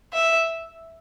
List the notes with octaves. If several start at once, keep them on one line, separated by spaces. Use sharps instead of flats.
E5